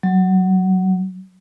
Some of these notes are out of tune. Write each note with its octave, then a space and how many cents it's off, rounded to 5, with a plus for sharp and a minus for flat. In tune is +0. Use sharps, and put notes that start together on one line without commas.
F#3 +15